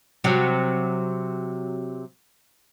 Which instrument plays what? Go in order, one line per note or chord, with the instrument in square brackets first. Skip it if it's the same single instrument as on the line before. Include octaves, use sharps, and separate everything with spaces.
[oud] C3 F#3